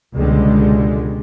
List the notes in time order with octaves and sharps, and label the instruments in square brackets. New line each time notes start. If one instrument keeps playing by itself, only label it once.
[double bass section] C#2 B2 D3 G3 G#3